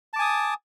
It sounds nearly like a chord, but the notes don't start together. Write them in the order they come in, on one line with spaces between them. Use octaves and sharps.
A5 D6 G#5 D#6